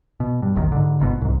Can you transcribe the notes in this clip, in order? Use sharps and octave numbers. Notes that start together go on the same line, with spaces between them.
B2
G2
E1 A#1 A2 D#3
G#2 D3
G1 G#2 B2
C2 G#2